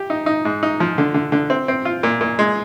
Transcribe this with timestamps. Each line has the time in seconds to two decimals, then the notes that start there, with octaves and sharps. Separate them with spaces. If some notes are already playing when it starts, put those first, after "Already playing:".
Already playing: G4
0.10 D#4
0.26 D#4
0.45 G#2
0.63 D#4
0.80 F3
0.98 D3
1.14 D3
1.32 D3
1.50 C4
1.68 C4
1.85 F4
2.03 A#2
2.21 A#2
2.39 G#3